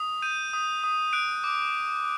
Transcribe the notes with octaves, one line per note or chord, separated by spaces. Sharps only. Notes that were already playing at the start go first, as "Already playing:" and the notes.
Already playing: D#6
G6 D#7
D#6
D#6
F#6 D7
D6